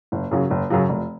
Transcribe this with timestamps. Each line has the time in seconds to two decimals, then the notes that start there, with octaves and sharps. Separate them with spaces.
0.12 F#1
0.31 F#2 C#3 F#3
0.50 F#1
0.70 F#2 C#3 F#3
0.89 F1